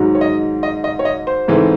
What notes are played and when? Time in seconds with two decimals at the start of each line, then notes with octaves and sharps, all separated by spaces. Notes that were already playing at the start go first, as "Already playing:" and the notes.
Already playing: G#2 D#3 F#3
0.15 C#5
0.21 D#5
0.63 D#5
0.84 D#5
0.99 C#5
1.05 D#5
1.27 C5
1.48 G#2 E3 A3 C4